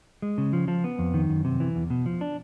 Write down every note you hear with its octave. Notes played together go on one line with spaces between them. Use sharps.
G#3
C#3
F3
F3
B3
F2
D#3
F#2
C3
E3
E2
B2
F3
D4